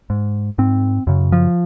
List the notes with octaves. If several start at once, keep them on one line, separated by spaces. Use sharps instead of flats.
G#2
G#2 C4
F#2 C#3
F3